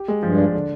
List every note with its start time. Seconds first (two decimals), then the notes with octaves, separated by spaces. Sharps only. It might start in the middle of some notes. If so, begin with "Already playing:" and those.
Already playing: G4
0.08 G#3
0.23 G2 F3
0.38 D4
0.54 D3